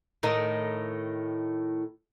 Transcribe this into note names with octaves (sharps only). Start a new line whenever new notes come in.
A2 D#3 D#4